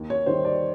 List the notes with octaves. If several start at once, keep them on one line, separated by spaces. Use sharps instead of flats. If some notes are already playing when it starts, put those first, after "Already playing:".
Already playing: D#2
C#5
D#3 G3 C5
D5